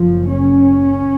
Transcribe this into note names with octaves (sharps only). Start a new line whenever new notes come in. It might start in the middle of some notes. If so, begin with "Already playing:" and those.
Already playing: F#1 F#2 C#3 F3
C#4